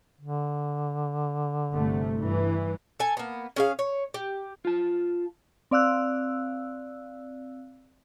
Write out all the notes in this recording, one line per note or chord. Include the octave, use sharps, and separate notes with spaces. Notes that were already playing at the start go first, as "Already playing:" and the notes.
D3
G1 C3 A3
G2 E3
A4 G#5
A#3 B3
C#4 G#4 F5
C#5
G4
F4 A5
C4 D5 F5 E6 F#6